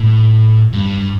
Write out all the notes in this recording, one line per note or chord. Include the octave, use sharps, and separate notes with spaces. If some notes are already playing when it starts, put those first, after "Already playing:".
Already playing: A2
G2